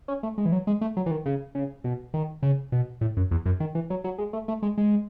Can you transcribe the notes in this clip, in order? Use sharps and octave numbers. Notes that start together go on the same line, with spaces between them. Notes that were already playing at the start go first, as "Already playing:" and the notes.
C#4
A3
G#3
E3
F#3
G#3
A3
F#3
E3
D#3
C#3
C#3
B2
D#3
C#3
B2
A2
F#2
E2
F#2
D#3
E3
F#3
F#3
G#3
A3
A3
G#3
G#3